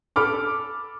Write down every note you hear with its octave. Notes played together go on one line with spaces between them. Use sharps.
A4 B5 D6 F6